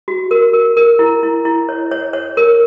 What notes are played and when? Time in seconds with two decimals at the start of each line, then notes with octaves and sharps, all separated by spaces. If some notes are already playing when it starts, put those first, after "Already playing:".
0.08 F#4
0.31 A#4
0.53 A#4
0.77 A#4
0.99 E4
1.23 E4
1.45 E4
1.69 C#5
1.91 C#5
2.13 C#5
2.37 A#4